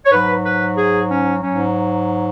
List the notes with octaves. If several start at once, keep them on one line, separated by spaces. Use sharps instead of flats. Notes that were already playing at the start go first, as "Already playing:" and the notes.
C#5
G#2 F#3 B4
B4
G#4
C#4
G#2 F#3 C#4